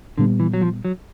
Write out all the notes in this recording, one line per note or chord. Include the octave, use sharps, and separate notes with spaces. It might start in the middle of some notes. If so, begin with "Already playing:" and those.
A#2 D3 G3 B3
E3
F#3
F3
F#3